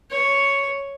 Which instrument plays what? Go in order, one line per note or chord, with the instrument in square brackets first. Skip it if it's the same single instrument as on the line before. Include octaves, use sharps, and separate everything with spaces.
[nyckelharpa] C#5